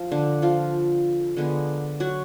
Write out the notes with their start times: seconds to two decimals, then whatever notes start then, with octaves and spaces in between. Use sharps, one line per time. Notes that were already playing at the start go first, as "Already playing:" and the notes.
Already playing: F3 F4
0.12 D3 D4
0.42 F3 F4
1.37 D3 G#3 B3
2.00 F#3 F#4